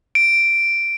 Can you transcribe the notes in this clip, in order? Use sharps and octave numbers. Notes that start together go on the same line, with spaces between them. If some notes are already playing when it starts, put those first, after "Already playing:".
D7